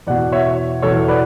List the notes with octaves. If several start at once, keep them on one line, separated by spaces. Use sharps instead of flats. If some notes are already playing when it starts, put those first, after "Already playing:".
E2 B2 D5 F#5
C#5 E5
E2 B2 A4 C#5
B4 D5